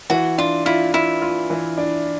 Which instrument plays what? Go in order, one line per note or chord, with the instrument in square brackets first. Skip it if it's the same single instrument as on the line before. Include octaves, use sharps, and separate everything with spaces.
[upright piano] E3 [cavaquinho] F#4
[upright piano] D4 [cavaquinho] F4
[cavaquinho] E4 [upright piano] F4
[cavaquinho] E4 [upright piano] F4
[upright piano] F4
E3
D4